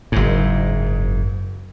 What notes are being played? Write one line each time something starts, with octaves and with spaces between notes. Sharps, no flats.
F#1 G#2